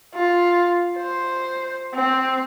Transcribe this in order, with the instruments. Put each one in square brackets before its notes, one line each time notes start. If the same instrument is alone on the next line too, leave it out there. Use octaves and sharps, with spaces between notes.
[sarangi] F4
C5
C4